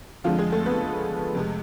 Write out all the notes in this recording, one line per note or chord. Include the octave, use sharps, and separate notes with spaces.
F2 D3 F3 G#3 F4
G#3 G#4
A3 A4
B3 B4
F2 C3 G#3